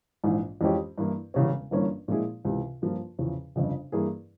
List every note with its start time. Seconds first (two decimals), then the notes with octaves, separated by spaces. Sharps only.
0.24 A#1 G#2 E3
0.61 F2 E3 G#3 C#4 G4
0.98 G2 E3 A#3 E4
1.34 E1 E2 C#3 G3 C#4
1.71 G1 G2 E3 A#3 C#4
2.08 A#2 F3 G#3 E4 G#4
2.45 C#2 C3 E3
2.82 G2 F3 A#3 F4
3.19 E2 C#3 F3
3.56 G1 F2 C#3
3.92 G2 E3 A#3 E4 G#4